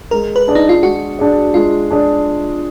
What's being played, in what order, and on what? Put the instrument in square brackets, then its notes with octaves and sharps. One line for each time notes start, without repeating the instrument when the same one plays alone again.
[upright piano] G#3 [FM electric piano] A#4
[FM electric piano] B4
[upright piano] D4 G#4 D5
[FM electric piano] D#4
F4
[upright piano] G#3 [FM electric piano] F#4
[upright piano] D4 G#4 D5
[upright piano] G#3 [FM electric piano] F4
[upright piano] D4 G#4 D5